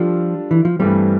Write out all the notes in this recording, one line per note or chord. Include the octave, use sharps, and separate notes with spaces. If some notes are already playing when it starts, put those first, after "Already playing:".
Already playing: F3 G3 D4 F4 A4
E3
F3
G2 E3 G3 A3 C4